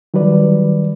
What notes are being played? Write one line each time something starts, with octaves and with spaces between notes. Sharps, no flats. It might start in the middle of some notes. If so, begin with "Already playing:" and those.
D#3 F#3 G3 B4 D5